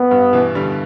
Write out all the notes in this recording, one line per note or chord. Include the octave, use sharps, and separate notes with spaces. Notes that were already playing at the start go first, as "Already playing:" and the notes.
Already playing: G2 B3
G2
B2 E3
D3 G3